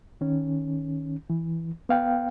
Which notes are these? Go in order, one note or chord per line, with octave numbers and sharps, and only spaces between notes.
D#3 C#4
E3
B3 F5 G5